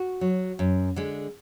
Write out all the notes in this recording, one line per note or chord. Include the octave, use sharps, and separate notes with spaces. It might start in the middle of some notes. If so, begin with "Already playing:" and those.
Already playing: F#4
F#3
F#2
D3 G#3